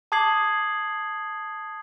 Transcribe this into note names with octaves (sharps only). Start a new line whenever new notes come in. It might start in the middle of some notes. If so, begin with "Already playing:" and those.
A5 D6 D#6 G#6 C7 F#7